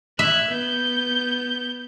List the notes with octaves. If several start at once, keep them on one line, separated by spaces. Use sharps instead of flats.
E5 F#6 G#6
B3 G6